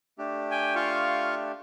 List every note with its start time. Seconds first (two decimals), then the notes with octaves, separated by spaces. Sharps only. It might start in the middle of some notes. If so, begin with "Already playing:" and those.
0.18 A3 D4 G4
0.51 G5 G#5
0.75 F4 F5 C#6